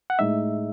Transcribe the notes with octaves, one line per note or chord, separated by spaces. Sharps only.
F#5
A2 G#3 D#4 E5